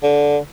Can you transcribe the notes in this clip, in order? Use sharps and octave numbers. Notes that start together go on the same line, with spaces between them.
D3